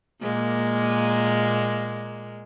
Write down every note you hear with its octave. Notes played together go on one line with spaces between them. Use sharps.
A#2 G#3 A#3